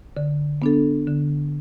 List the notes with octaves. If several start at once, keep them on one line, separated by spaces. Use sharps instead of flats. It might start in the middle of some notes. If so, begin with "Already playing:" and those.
D3
B3 D4 A4
D3